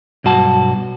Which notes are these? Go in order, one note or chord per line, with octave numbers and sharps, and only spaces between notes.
B1 G2 F#4 A5